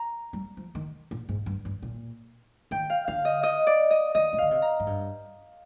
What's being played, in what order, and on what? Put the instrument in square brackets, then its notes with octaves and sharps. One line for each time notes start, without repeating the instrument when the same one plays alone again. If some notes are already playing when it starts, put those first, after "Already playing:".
Already playing: [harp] A#5
[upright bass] G3
F3
D#3
A#2
G#2
G2
G2
A#2
[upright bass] D#3 [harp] G5
[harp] F5
[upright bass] D3 [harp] F5
[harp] D#5
D#5
D5
D#5
[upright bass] D#3 [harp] D#5
[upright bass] C3
[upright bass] D3 [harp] F5
[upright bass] C3
[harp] A#5
[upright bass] G#2
G2